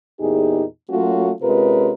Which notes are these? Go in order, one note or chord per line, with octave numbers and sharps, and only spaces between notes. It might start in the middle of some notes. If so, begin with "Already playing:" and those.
E2 A#2 D#4 G4 G#4
F#3 A3 A#3 C#4 F4 F#4
C3 G#3 C#4 F4 A#4 B4